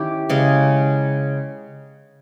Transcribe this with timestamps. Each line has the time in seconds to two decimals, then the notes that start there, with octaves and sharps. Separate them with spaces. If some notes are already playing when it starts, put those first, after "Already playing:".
Already playing: D#3 C#4 E4 G4
0.29 C#3 G#3 C#4